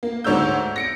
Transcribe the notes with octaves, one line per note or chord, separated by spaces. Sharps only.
A#3
D2 G#2 C#5 D5 E6 G6
A#6 C#7 D7